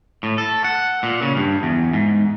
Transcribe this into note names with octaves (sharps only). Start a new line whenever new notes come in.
A2
A4
F#5
A#2
C#3
G2
E2
G#2